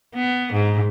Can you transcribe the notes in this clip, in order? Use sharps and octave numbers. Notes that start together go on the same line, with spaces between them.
B3
G#2